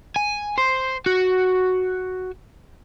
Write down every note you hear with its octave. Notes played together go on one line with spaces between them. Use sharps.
G#5
C5
F#4